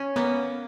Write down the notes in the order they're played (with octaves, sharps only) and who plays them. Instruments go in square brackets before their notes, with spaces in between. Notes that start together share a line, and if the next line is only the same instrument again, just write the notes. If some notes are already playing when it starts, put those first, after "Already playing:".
Already playing: [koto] C#4
[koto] A#3 [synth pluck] B3